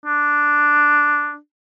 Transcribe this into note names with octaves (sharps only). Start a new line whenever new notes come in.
D4